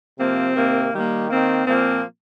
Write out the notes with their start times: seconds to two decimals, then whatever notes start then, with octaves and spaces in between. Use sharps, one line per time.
0.19 C3 F3 A#3 C4
0.56 C3 D#3 A#3
0.93 D#3 G3 A#3
1.30 D#3 A#3 C4
1.67 A#2 F3 A#3 C4